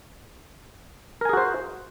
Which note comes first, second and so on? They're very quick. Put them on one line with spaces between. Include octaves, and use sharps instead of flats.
A#4 G#5 G#4 F#4 C5